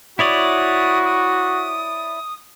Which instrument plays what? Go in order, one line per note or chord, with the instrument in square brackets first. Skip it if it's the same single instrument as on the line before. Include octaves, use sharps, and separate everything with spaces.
[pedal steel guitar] E4 C#5 D5 [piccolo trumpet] F#4 [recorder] D#6
[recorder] D#6